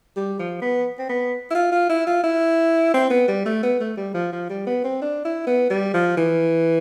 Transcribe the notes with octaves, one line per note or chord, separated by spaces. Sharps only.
G3
F3
B3
C4
B3
E4
F4
F4
E4
F4
E4
C4
B3
G3
A3
B3
A3
G3
F3
F3
G3
B3
C4
D4
E4
B3
G3
F3
E3